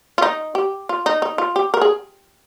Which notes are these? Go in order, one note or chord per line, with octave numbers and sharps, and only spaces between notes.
F4
D#4
G4
F4
D#4
D#4
F4
G4
A#4
G#4